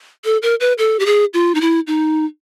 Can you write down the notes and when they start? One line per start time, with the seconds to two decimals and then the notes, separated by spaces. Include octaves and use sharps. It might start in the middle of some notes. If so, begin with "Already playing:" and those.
0.25 A4
0.42 A#4
0.60 B4
0.78 A4
1.00 G4
1.06 G#4
1.34 F4
1.55 D#4
1.61 E4
1.87 D#4